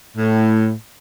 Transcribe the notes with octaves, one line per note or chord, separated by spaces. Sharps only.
A2